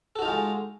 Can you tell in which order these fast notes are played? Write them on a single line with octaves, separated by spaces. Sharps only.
A4 F#4 D#4 F4 G#3